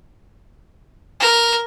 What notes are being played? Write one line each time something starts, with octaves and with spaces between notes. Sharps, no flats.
A#4